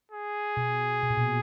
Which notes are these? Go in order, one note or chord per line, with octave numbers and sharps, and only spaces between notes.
G#4
B2
B2
A#2
B2